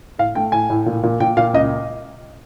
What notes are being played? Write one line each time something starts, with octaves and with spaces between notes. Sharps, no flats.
A2 F5
A3 G5
A2 G#5
A2
A#2
A#2
A#2 G5
A#2 F5
C#2 D#5